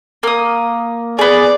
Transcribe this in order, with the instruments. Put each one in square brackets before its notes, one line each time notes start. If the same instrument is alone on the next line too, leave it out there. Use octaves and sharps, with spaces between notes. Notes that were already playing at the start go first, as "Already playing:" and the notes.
[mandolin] A#3 D#6
[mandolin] B3 G#4 [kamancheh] D5